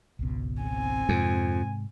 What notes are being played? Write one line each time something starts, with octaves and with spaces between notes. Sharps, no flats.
G#1 C#2 B2
C4 G#5
F2 G#2 C3 G#3